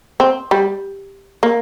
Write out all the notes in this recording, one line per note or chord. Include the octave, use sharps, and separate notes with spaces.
C4
G3
A#3